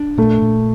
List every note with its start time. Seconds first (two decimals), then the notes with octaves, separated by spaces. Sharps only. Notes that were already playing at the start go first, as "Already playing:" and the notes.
Already playing: D4
0.18 A#2 A3
0.42 A#2